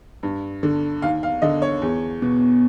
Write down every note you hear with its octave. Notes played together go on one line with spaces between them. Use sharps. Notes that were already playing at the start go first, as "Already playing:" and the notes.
G2
D3
D#2 F5
F5
D3 D#5
C#5
E2
B2